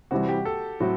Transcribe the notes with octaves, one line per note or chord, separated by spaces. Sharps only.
C3 E3 G3 C4 F#4
G4
A4
A2 F#3 C4 F#4